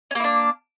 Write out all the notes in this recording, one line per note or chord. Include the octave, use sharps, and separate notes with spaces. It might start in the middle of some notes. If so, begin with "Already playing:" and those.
A#3 C#4 D4 E4